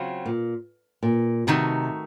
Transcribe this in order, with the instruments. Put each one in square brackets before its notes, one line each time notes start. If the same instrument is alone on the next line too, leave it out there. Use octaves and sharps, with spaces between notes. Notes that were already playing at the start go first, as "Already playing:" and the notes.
Already playing: [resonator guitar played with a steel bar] C#3 F#3 C4 F4
[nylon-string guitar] A#2
A#2
[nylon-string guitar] C3 [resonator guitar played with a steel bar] D#3 A3 D#4 F#4